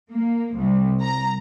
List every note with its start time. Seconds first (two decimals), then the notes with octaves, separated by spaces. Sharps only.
0.11 A#3
0.54 C2
1.02 A#5